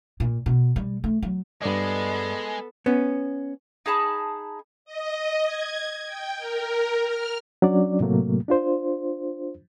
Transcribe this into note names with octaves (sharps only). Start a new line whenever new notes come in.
A#2
B2
G3
A3
F#3
G2 G#3 B3 A4 D5 D#5
B3 C#4
D#4 G#4 A5 B5
D#5
G#6
G5
A#4
F6
F#3 C#4 D4 D5
A2 C3 F#3 A3 A#3
D4 F4 C5